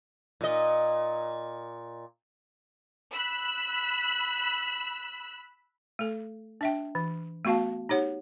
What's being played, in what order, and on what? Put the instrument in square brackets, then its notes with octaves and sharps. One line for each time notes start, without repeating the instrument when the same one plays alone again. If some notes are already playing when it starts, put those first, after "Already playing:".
[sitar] A#2 D#5
[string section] B5 E6 F#6
[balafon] A3 A4
D4 E5 G5
E3
A3 B3 F#4 F5 A5
D#4 G4 C#5 F#5